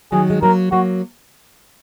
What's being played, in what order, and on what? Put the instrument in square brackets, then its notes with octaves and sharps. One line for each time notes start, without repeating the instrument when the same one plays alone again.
[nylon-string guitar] D#3 F#3 [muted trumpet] G#4
[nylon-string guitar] G#3
[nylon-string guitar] F#3 A#3 [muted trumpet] A#4
[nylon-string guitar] F#3 A#3 [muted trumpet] F#4